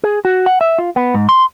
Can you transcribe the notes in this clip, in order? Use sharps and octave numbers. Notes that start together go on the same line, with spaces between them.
G#4
F#4
F#5
E5
F4
B3
G#2
C6